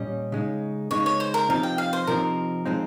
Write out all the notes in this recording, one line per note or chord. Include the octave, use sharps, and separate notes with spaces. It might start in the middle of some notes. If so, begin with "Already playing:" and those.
Already playing: A#2 G3 C#4 D#5
C#3 G#3 D#4
C#3 G#3 D#4 C#5
C#5
C5
A#4
C3 F3 C4 D#4 F5
G5
F5
C5
C3 F3 C4 D#4 A#4
F3 G#3 C4 D#4